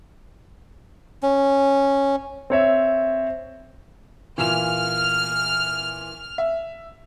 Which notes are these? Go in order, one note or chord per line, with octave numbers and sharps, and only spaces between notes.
C#4
C4 C#5 E5
A#2 E3 F6
E5